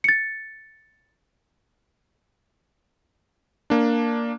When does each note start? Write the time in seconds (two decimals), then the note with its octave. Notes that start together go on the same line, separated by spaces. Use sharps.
0.04 A6 C#7
3.70 A#3 D4